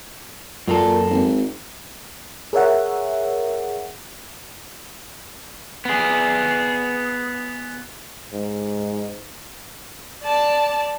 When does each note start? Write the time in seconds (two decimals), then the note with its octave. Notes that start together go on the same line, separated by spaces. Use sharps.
0.68 F#2 A#2 A#3 A4
1.10 G#1
2.53 G#4 A#4 C#5 E5 F#5
5.85 B3 G#4
8.32 G#2
10.23 D5 A5